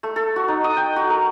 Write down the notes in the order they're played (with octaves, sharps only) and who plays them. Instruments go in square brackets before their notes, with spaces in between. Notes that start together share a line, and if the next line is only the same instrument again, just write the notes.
[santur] A3
A4
F#4
D#4
D#6
G5
F#4
A#4